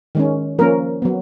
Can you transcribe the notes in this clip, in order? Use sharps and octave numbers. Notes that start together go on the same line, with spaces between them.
D#3 G#3 C#4
F3 A#3 C#4 A#4
F#3 B3